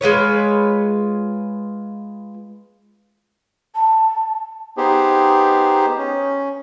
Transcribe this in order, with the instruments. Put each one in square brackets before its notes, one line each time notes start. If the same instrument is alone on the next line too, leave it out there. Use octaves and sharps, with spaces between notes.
[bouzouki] G#3 F4 B4 C#5
[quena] A5
[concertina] B3 D#4 G4 G#4 C5
C#4